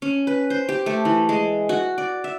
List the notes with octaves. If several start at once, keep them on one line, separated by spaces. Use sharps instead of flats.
C#4
B4
C5
G4
A3
E3
G#3
F#4
D5
E5